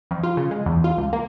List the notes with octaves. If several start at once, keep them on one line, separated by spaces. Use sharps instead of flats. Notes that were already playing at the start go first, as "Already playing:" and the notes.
F2
F4
C#3
G#3
E2
F4
C#2
A#3